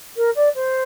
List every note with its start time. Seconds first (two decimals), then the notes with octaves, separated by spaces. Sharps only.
0.17 A#4
0.35 D5
0.55 C5